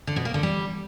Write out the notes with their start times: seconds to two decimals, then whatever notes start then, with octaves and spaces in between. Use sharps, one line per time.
0.07 D3
0.16 B2
0.25 A#3
0.34 D3
0.43 G3